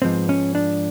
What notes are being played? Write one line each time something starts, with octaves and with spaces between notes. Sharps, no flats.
G#2 F3 G#3 B3 C4
C#4
D4